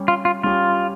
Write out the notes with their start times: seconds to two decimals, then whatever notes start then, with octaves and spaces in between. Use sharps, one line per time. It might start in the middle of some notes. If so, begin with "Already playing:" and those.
Already playing: G3 C#4 G4 C#5
0.08 F4
0.25 F4
0.43 G3 C#4 F4 G4 C#5